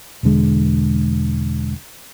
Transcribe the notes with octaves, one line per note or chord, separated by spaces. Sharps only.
E1 E2 D3 G#3